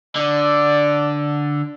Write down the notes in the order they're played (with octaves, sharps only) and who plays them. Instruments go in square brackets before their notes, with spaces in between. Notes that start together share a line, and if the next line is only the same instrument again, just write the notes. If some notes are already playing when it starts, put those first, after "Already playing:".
[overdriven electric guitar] D3 [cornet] D5